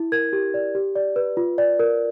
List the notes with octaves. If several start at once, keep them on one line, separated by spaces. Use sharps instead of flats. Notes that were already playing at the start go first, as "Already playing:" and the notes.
Already playing: E4
A#4 G#6
G4
D5
G4
D5
B4
F4
D5
A#4